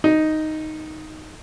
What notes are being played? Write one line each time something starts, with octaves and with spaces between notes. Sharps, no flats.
D#4